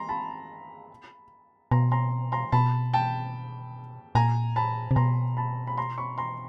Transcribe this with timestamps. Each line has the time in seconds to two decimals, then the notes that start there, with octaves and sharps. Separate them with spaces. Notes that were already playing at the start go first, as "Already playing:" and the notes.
Already playing: A#5 C6
0.09 A5 B5
1.71 B2 A#5 C6
1.92 A#5 C6
2.32 A#5 C6
2.52 B2 A5 B5
2.93 G5 A5
4.15 A#2 G#5 A#5
4.56 A5 B5
4.91 C3
4.96 B2 A#5 C6
5.37 A5 B5
5.67 B5
5.77 A#5 C6
5.98 B5 C#6
6.18 A#5 C6